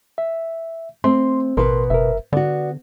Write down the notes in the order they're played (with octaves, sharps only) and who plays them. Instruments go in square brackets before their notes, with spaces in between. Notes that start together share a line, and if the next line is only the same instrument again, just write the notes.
[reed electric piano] E5
[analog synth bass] A3 [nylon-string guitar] C4 [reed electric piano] C6
[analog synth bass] A1 [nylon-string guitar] B2 B4 [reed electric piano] A#4 C6
[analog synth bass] F#1 [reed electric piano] A#4 E5
[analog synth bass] D3 [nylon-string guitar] B3 F#4 [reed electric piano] D5